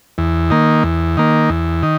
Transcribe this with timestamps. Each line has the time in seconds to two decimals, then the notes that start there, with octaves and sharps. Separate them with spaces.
0.18 E2
0.50 D#3 A#3
0.84 E2
1.17 D#3 A#3
1.50 E2
1.83 D#3